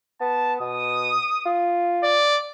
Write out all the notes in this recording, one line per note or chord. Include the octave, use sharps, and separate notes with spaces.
B3 A5
B2 D#6
F4
D5